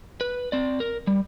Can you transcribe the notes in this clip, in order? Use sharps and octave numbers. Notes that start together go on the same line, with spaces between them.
B4
C4 D5
A#4
G3